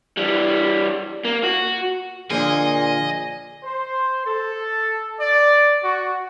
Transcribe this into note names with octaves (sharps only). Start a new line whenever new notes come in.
E3 G3
A#3
F#4
A#2 D3 F3 A#3 G#4 D#5
C5
A4
D5
F#4